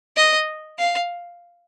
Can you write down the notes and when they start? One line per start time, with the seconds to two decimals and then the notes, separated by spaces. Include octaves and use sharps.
0.16 D#5
0.78 F5